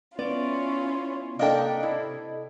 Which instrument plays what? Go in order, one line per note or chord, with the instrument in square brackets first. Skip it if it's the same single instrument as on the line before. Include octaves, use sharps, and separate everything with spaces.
[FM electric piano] B3 [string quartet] C#4 E4 F4 [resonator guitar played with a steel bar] D5
[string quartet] C3 [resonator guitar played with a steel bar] A#3 D4 G5 [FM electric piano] A4 D5 D#5
[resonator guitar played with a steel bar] E4